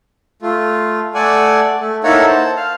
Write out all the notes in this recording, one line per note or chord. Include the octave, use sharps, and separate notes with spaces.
A3 F4
A3 A4 D5 F#5 G#5
A3
A#3 D#4 E4 A4 C#5 F#5
C5 A5
F5